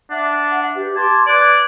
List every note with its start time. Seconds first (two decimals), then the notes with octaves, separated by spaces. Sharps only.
0.10 D4 E5 F#5
0.74 G4 B4
0.96 A5 C6 D6 G#6
1.27 B4 D5 F#6 G#6